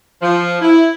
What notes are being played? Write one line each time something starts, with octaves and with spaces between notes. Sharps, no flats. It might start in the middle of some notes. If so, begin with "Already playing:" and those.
F3
E4